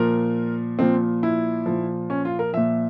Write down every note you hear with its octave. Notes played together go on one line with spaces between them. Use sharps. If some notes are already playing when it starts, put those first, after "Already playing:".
Already playing: A#2 F3 A#4
A#2 F3 C4
E4
A#2 F3
C#4
F4
A#4
A#2 F3 E5